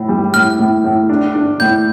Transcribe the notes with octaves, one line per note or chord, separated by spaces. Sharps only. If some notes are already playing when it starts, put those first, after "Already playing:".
Already playing: A2
G3
A2 F6
A2
A2
D4
D4
A2 G6